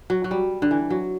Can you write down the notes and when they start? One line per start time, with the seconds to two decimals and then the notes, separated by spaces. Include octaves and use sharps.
0.10 F#3
0.24 F#3
0.31 G3
0.62 D3
0.71 E3
0.90 F#3